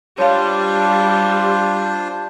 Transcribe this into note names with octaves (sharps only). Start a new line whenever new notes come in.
G3 D4 F4 C5 C#5 F5